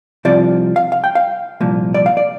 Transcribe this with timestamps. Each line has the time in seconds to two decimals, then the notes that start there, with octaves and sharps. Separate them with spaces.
0.25 C2 C3 F3 D5
0.76 F5
0.92 F5
1.04 G5
1.15 F5
1.60 C2 A#2 F3
1.94 D5
2.06 F5
2.17 D5